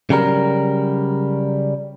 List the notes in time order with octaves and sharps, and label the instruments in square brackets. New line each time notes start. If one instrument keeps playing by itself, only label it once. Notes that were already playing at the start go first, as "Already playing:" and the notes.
[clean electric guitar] C#3 F#3 G3 A#4